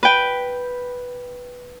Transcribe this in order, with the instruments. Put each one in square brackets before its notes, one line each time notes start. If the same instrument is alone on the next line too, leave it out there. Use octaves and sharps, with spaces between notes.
[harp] B4 G5